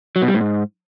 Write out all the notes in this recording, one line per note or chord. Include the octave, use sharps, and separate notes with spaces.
F#3
B2
G3
A2
G#2